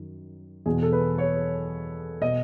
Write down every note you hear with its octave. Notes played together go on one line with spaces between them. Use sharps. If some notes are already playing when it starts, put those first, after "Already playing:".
Already playing: F#2 D#3
E2 B2 G#4
A4
B4
C#5
B2 D#5